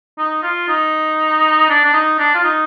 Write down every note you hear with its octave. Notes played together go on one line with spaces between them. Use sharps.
D#4
F4
D#4
D4
D4
D#4
D4
F4
D#4